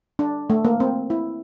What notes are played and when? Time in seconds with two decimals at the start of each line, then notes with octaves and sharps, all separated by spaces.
0.19 D4
0.50 A3
0.65 A#3
0.80 C4
1.10 E4